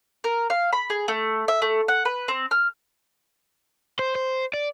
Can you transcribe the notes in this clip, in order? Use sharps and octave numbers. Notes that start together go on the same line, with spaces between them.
A#4
F5
B5
G#4
A3
E5
A3
F#5
B4
C4
F6
C5
C5
D5